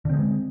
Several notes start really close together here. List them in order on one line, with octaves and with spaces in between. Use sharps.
D3 C4 G#3